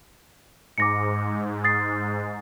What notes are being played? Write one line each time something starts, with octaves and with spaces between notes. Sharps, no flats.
G#2 D6 A#6 C#7
D#6 A6 C7